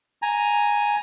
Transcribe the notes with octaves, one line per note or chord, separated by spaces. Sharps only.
G#5 A#5